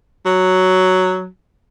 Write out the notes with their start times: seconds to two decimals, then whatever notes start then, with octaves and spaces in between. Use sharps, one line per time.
0.26 F#3